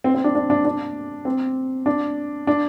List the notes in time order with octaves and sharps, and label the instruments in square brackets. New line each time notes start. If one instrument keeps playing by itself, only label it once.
[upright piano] C4
C4
D4
D4
D4
D4
C4
D4
D4